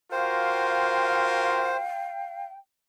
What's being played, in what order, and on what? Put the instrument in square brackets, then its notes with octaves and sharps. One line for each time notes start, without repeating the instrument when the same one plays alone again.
[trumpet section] F4 F#4 A#4 [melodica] C5 [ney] F5 [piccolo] G5